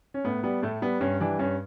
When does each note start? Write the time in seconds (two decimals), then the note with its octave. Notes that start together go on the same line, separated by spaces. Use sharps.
0.14 C#4
0.25 A2 B3
0.43 G3 B3
0.62 A2 A3
0.82 G3 B3
1.01 G2 C#4
1.20 E3 G3 D4
1.39 G2 C#4